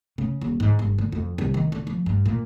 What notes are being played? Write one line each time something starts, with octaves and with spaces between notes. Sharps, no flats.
C#3
D#1
G#2
G1
D3
F2
C2
D#3
D3
F3
G2
A#2